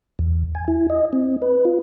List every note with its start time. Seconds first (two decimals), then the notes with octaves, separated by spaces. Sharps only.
0.19 E2
0.55 G#5
0.68 E4
0.90 D#5
1.13 C4
1.42 B4
1.65 F4